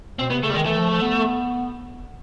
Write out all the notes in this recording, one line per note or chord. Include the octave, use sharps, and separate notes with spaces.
B2 C4
C3 B3
C#3 A3
G3
D#3 G#3
E3 A3
F3
F3
B3